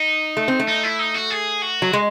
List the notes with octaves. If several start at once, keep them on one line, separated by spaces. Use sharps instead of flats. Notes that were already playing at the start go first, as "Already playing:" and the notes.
Already playing: D#4
A3
C4
A3
D#4
E4
D#4
F#4
G#4
F#4
F#3
G#3